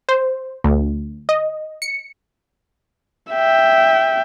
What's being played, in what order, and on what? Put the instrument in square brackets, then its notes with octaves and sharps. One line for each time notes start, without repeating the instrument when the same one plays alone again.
[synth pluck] C5
D2
D#5
C#7
[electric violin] E5 G5